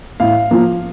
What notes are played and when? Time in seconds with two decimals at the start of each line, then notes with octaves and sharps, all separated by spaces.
0.20 A2 F5
0.51 F3 A#3